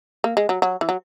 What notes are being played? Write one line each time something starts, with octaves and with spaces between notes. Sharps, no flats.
A#3
G#3
F#3
F#3
E3
F#3